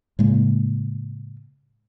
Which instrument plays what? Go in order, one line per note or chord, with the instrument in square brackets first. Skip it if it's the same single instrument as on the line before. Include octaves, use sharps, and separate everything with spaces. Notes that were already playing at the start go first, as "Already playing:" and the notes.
[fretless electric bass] A2 C#3 G#3 A#3